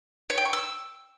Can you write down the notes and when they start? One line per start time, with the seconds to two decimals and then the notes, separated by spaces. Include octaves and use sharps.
0.30 C#5
0.38 G5
0.45 C#6
0.53 E6